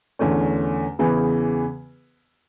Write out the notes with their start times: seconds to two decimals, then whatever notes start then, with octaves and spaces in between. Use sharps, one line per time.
0.19 E2 D3 A3 C#4
0.99 E2 C#3 E3 B3